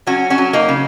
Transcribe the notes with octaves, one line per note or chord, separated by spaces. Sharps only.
F#3 C#4 F#4
C#4 F#4
F#3
A#3 D#4
C#3